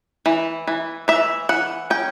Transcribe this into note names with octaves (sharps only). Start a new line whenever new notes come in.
E3
E3
E3 E5
E3 F#5
C#4 G5